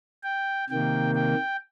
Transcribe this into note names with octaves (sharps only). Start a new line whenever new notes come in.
G5
C3 D#3 A#3 G5
G5